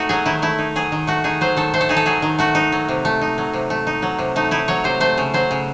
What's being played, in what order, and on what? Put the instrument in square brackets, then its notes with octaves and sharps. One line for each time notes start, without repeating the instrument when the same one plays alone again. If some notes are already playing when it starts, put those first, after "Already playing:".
Already playing: [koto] A3 D#4 F#4
F#3 G#4
D#3 E4
A3 E4
D#4
F#3 G#4
D#3
A3 F#4
D#4 G#4
F#3 C5
D#3 A4
A3 C5
A4
D#4 G#4
A4
F#3 G#4
D#3
A3 F#4
D#4
F#3
C3
A3
D#4
F#3
C3
A3
D#4
F#3
C3
A3 D#4
D#4 E4
F#3 C#5
C3 C5
A3 C5
C#3
F#3 C5
C#3